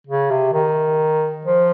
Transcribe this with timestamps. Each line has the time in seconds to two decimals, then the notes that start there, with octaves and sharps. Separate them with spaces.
0.07 C#3
0.31 C3
0.53 D#3
1.45 F3